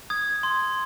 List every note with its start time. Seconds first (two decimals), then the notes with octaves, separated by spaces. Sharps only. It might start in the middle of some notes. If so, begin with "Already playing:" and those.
0.10 D#6 G#6
0.43 C6